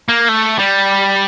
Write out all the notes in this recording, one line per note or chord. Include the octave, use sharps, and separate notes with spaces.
A#3
A3
G3